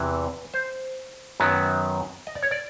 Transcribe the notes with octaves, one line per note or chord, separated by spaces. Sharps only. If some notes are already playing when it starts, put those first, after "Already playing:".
Already playing: E2 C3 E3 B4
C5
F#2 D#3 F#3 B3
D#5
D5
C#5
D5